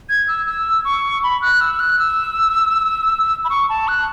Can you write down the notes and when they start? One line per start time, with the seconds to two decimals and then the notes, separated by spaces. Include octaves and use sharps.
0.09 G#6
0.28 E6
0.47 E6
0.85 C#6
1.23 B5
1.42 F#6
1.61 E6
1.80 F#6
1.99 E6
3.45 B5
3.50 C#6
3.69 A5
3.88 F#6